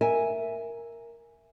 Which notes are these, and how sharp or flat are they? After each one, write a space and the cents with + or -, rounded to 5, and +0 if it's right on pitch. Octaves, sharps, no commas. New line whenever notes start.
A#4 +0 E5 +0 G#5 +0